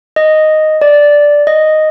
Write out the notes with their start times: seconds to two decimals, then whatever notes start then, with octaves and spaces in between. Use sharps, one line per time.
0.16 D#5
0.81 D5
1.47 D#5